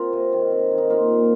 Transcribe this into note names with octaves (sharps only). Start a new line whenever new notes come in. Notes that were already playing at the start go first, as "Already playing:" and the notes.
Already playing: C4 F4 A#4
C3
D#3
C4
D#3
D#4
A#3 F4
A#2